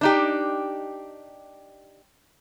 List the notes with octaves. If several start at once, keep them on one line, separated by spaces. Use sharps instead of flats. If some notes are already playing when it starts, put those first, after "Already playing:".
D4 D#4 G4